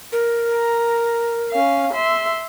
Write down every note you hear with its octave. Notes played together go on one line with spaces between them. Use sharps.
A#4
A#5
C#4 F5
E5 C6